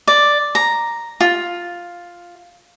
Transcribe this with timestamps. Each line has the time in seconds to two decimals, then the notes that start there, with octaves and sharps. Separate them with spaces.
0.08 D5
0.55 A#5
1.21 F4